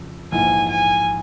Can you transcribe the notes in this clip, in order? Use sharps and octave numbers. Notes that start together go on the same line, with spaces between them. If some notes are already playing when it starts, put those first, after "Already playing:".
Already playing: F2 C#3
A#1 G#2 E3 G#5
G#5